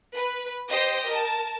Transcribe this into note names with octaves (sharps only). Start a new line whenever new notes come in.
B4
G4 C5 D#5 G5
A#4 A5